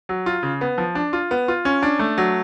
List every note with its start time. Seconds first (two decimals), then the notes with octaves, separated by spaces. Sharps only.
0.09 F#3
0.26 F4
0.43 C#3
0.61 B3
0.78 F3
0.95 D4
1.13 F4
1.31 B3
1.48 F4
1.65 C#4
1.83 D4
1.99 A3
2.18 F#3